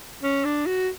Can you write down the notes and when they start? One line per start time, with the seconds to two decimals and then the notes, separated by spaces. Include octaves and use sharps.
0.23 C#4
0.45 D4
0.66 F#4